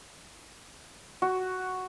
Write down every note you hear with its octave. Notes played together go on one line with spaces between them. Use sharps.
F#4